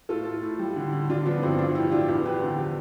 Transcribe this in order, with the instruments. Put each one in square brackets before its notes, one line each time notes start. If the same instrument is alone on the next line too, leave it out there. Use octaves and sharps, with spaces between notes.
[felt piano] A2 F4 A4
A2
A2
G3
D3
D3
D3 D4 F4
F3 B3 D4
G2 C4 E4
F3 D4 F4
A2 E4 G4
F3 D4 F4
E2 E4 G4
E2 G4 B4
D3
F3